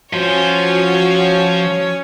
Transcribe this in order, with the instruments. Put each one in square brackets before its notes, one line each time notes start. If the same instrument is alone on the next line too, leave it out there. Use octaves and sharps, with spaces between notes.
[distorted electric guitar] F3 C5 [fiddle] C#4 C#5 [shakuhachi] F#4